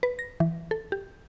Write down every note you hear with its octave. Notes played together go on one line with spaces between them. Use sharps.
B4
A#6
E3
A4
G4